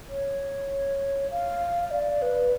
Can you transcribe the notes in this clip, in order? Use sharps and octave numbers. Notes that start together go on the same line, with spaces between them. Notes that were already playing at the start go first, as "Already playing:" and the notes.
C#5
F5
F5
D5
B4